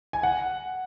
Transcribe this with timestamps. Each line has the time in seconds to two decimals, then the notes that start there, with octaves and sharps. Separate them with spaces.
0.13 G#5
0.23 F#5